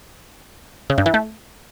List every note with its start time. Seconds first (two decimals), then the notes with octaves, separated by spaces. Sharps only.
0.90 C#3
0.98 G2
1.06 E3
1.14 A3